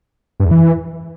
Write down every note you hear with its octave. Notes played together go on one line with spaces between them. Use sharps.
G2
E2
E3